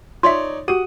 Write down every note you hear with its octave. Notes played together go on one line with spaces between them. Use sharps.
D#4 F4 C#5 D5 E5 C6
F#4 G4 F#5 D#6 D#7